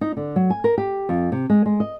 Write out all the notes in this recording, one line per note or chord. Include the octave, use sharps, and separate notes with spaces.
D#4
D3
F#3
G#5
A#4
G4
F2
C3
G#3
G#3
D#5